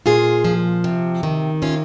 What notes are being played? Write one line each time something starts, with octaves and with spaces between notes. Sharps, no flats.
A#2 F4 G#4
F3
C3
D#3
C3 C#4 F4